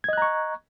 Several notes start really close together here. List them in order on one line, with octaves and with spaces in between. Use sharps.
G#6 D#5 F#6 A#5 C#6